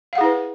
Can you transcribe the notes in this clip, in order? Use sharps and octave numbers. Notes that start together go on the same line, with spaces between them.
E4 G#4 B4 F5 F#5